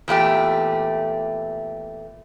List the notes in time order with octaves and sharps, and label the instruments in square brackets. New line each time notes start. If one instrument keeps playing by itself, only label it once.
[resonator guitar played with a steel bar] E2 A#2 A3 G4